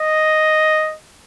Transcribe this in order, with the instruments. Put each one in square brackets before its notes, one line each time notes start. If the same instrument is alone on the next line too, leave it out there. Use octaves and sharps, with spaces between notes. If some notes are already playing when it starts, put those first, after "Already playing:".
Already playing: [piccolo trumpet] D#5